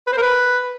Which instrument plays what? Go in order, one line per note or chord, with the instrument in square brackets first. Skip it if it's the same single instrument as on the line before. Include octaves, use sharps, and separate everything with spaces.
[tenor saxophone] B4
C5
A#4
B4